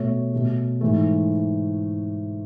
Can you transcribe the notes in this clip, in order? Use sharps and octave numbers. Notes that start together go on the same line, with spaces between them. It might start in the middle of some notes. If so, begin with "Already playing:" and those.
Already playing: B2 A3 C#5
B2 A3
G#2 E3 A3